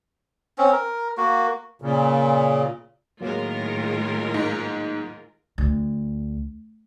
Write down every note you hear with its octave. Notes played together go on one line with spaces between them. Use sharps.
C4 C#4
A#4
A#3 F#4
A#2 C#3
A2 D#3 F#3 G#3 A#3 F4 A#4
G#2
D2